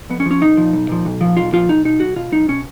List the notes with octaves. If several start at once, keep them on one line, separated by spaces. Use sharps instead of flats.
F2 B3
C#4
F3
C#4
B1 D#4
A#2 F3
B1
A#2 F3
B1
A#2 F3
B1 F4
A#2 F3 F4
B1 D#4
B2 D#4
B1 F#4
B2 F4
B1 D#4
B2 C#4